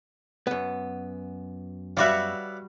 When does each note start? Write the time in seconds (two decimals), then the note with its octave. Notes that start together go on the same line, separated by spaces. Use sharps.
0.47 F#2 B3
1.97 G3 F#4 B4 C#5 D5 E5 F5